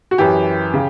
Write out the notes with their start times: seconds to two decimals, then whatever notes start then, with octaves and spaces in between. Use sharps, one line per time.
0.11 F#4
0.18 F#2 E3 G4
0.74 C#3